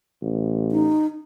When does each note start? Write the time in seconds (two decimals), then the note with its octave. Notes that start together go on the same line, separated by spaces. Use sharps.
0.22 A1
0.72 D#4